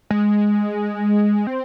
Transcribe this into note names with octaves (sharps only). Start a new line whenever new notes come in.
G#3
C4